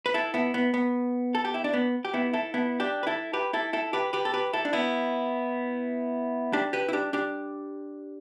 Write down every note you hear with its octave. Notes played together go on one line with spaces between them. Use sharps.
B4
E4 A4
B3 E4
B3
B3
A4
G4
E4
D4
B3
G4
B3 E4
E4 A4
B3 E4
D4 G4
B4
E4 A4
G4 B4
E4 A4
E4 A4
G4 B4
G4 B4
A4
G4 B4
E4 A4
D4
B3 E4
D4 G4
G4 B4
E4
D4 G4
D4 G4